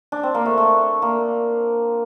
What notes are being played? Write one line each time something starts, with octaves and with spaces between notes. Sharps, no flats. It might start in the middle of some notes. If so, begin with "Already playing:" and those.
D4
C4
A#3
A3
A3
A#3